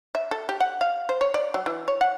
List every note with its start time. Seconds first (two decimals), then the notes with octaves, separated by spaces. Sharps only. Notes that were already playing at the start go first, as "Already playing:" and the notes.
0.15 E5
0.31 A4
0.49 G4
0.60 F#5
0.81 F5
1.09 C5
1.21 C#5
1.34 D5
1.54 F#3
1.66 E3
1.88 C#5
2.01 F#5